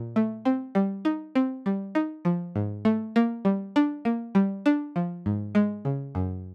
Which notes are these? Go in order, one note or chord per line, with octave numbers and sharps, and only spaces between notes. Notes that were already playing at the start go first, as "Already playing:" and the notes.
Already playing: A#2
A3
C4
G3
D#4
C4
G3
D#4
F3
G#2
A3
A#3
G3
D4
A#3
G3
D4
F3
G#2
G#3
C#3
F#2